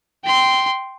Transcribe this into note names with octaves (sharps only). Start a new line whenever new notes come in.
G5 C6